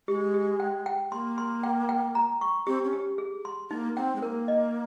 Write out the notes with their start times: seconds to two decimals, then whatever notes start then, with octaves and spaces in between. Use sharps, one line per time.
0.08 G#3 G4
0.34 G4
0.60 G5
0.86 G5
1.12 A#3 C6
1.38 C6
1.63 G5
1.89 G5
2.15 A#5
2.41 C#6
2.67 C4 G4
2.84 C#4
2.93 G4
3.18 G#4
3.45 C6
3.70 A#3 D#4
3.96 C4 G5
4.16 G#3
4.22 A#3 A#4
4.48 D#5